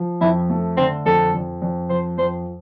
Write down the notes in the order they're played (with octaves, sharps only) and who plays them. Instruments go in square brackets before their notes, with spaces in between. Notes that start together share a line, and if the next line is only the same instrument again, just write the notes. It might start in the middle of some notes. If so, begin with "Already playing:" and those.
Already playing: [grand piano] F3
[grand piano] F2 [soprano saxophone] E4
[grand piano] A3
[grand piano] D3 [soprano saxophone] C4
[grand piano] F2 [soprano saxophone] A4
[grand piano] F2
F2
[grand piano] F3 [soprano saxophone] C5
[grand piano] F2 [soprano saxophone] C5